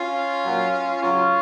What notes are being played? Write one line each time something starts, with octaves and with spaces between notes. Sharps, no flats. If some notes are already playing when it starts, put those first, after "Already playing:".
Already playing: C#4 F4
A#2 F#3
C#3 F#3 C#4 F4